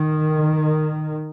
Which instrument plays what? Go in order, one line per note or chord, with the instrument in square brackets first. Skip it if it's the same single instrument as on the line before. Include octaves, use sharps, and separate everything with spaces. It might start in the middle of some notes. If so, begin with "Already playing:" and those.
Already playing: [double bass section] D#3